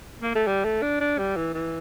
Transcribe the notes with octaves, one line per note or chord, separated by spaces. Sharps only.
A#3
A3
G3
A3
D4
D4
G3
E3
E3